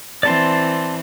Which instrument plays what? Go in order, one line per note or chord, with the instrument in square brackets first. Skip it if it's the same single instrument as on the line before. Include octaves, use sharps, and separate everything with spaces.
[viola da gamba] E3 C4 [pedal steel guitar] D5 A5 C6